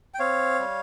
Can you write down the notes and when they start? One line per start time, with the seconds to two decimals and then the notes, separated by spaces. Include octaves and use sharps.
0.14 G5
0.19 C4 C#5 F5
0.59 G3